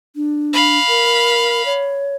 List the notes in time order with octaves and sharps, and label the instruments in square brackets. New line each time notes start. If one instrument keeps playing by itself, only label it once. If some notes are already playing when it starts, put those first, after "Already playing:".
[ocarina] D4
[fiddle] F5 B5
[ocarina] A#4
C#5